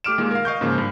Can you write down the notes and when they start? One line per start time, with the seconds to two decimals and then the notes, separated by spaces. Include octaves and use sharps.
0.04 A3 G4 D6 F6 D7 E7
0.18 A#2 D#3 G#3 A#3
0.31 A#4 F5
0.45 D#5 F5 C#6 G6
0.61 G#2 C#3 F3 A#3
0.78 G2